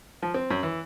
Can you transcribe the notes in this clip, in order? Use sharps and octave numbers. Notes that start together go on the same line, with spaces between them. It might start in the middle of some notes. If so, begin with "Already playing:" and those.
F3
C4
F#2
E3